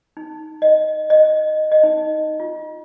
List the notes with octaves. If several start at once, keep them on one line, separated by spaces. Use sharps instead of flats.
D#4
D#5
D#5
D#5
D#4
F4